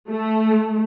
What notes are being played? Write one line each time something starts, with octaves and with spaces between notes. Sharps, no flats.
A3